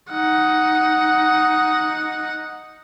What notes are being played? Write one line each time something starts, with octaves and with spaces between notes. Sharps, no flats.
D#4 F#5